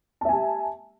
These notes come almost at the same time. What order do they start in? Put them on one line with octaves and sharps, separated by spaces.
A5 E5 G#5 G4